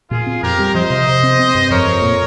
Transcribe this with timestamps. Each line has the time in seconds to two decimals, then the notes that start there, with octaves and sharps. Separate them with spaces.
0.11 A#2 F4 G#4
0.26 C4
0.43 F2 G4 A#4
0.59 G3
0.75 F3 C5 D#5
0.90 C3
1.07 C3
1.23 C4
1.39 C4
1.55 G2
1.70 F2 A#4 C#5
1.86 F2
2.02 A#2